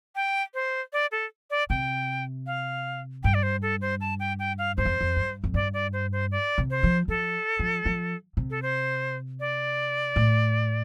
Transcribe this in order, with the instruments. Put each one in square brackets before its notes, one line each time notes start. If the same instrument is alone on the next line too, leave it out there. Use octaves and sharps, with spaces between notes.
[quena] G5
C5
D5
A4
D5
[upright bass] C3 [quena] G5
[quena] F5
[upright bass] G2 [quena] G5
[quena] D5
C5
A4
C5
A5
G5
G5
F5
[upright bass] G2 [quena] C5
[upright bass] F2
F2
G2
F2
[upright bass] G2 [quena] D5
[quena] D5
C5
C5
D5
[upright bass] C3
[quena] C5
[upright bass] F3
[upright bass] F3 [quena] A4
[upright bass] F3
F3
C3
[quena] A4
C5
D5
[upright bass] A2